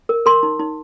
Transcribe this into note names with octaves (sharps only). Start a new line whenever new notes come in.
A#4
A#4 C6
D#4
D#4